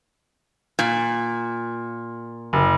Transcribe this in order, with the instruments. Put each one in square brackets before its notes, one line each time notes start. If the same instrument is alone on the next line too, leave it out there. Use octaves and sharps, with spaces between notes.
[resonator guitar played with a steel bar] A#2
[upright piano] F#1